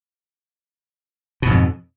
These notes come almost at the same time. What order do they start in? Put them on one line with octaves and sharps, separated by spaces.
B2 G#2 F2